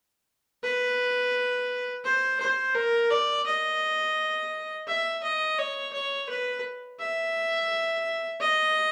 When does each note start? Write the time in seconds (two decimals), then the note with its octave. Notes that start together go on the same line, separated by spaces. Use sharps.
0.63 B4
2.05 C5
2.40 C5
2.75 A#4
3.11 D5
3.47 D#5
4.87 E5
5.23 D#5
5.59 C#5
5.94 C#5
6.29 B4
6.99 E5
8.40 D#5